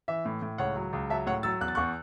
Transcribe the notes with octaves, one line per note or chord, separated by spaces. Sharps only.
E3 E5
A2
A2
C#2 C#5 F#5
F#3
C#2
F#3 E5 A5
A2 C#5 F#5
F#3 E6 A6
E2 F#6
A6
E2 C#6 F#6